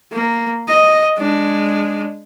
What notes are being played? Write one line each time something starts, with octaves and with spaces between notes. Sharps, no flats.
A#3
D#5
G#3 D4